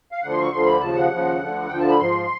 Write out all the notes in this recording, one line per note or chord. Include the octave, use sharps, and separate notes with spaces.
F5
D2 D3 F3 F#5
C6
C#6
D2 D3 F3 C6
B5
D#2 C#3 F3 A5
F#5
D#2 C#3 F3
D2 D3 F3
D2 D3 F3 G5
A5
B5
G#2 F3 C6